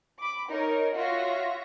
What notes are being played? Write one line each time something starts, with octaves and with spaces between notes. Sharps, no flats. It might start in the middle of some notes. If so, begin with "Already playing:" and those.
B5 D6
D#4 A#4 C#5
F4 F#4 C#5 E5 A#6